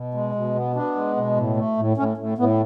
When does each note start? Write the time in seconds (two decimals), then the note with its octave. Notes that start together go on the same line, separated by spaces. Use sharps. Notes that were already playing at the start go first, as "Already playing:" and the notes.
Already playing: B2
0.14 G#3
0.35 B2
0.55 B3
0.75 B3 D4
0.95 G#3
1.16 B2
1.36 A2
1.57 A3
1.77 A2
1.97 A2 C#4
2.17 A2
2.38 A2 B3